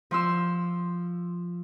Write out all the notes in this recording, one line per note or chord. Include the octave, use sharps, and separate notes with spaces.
F3 C6 E6